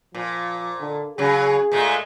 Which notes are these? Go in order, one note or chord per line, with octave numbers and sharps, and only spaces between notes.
A#2 F3
D3
C#3 F#3 G#4
A#2 G#3 A3